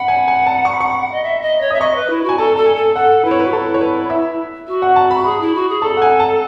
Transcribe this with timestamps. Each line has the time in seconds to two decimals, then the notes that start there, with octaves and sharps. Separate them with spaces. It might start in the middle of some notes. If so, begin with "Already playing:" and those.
Already playing: F#5 B5
0.08 G#5
0.28 G#5
0.47 A5
0.65 C#6
0.73 B5
0.81 C#6
1.12 D#5
1.23 E5
1.42 D#5
1.61 C#5
1.70 E5 D#6
1.80 D#5 C#6
1.95 B4
2.10 E4
2.23 F#4
2.29 G#5
2.38 A4 A5
2.56 A4 A5
2.66 G#5
2.75 A4
2.96 A4 F#5
3.23 E4 B4
3.31 C#5
3.39 B4
3.45 F#4
3.52 E4 A4
3.74 C#5
3.81 B4
4.10 E5
4.67 F#4
4.82 F#5
4.96 A5
5.11 B5
5.24 G#4 B5
5.40 E4
5.55 F#4
5.69 G#4
5.81 A4 A5
5.97 F#5
6.02 G#5
6.20 A5